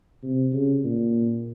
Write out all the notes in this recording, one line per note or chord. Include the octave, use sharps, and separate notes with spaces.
C3
C#3
A#2